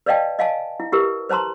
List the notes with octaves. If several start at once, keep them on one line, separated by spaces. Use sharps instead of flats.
B4 D5 D#5 F5 G5 A5
D#5 F5 G#5 A5
E4
E4 G4 A#4 B4
B4 C5 A5 A#5 C6